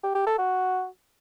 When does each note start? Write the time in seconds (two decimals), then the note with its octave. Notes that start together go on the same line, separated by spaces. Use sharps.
0.03 G4
0.15 G4
0.27 A4
0.38 F#4